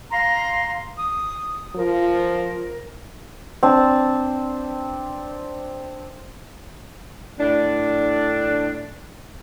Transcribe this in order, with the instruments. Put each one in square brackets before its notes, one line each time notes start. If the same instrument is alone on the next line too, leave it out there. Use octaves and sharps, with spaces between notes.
[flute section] F5 A#5 C6
D#6
[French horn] F3 [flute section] A#4
[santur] C4 D4 A5
[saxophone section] A2 D4